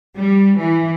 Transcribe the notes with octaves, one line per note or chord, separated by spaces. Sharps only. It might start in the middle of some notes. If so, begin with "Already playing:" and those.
G3
E3